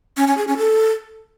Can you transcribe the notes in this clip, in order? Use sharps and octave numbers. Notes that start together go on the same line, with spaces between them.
C#4
C#4
G#4
C#4
A4